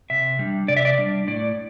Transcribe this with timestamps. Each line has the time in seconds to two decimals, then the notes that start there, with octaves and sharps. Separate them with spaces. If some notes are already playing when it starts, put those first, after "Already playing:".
0.10 C3 E5
0.39 G3 D4
0.68 C3 D5
0.77 E5
0.85 D5
0.99 G3 D4
1.27 A2 D5